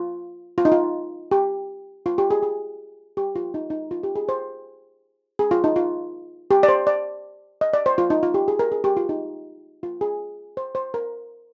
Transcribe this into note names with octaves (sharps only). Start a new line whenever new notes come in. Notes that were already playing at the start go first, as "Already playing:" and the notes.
Already playing: F4
F4
D#4
F4
G4
F4
G4
G#4
G#4
G4
F4
D#4
D#4
F4
G4
G#4
C5
G#4
F4
D#4
F4
G4
D5
C5
D5
D#5
D5
C5
F4
D#4
F4
G4
G#4
A#4
G#4
G4
F4
D#4
F4
G#4
C5
C5
A#4